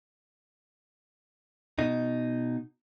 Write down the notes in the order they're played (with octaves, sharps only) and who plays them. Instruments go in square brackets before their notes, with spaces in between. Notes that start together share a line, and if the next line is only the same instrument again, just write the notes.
[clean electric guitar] B2 D#4